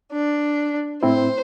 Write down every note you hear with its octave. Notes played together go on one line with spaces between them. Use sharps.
D4
A2 C4 E4 C5